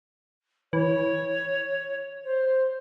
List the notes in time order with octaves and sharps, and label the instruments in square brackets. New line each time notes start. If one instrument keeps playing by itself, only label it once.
[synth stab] E3 [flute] C#5
[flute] C5